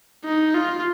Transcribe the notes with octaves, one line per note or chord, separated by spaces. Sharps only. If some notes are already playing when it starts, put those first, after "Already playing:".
D#4
F4